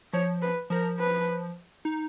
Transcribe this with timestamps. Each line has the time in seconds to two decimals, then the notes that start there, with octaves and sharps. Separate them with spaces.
0.13 F3 C#5
0.42 B4
0.70 F3 A#4
0.99 B4
1.85 D#4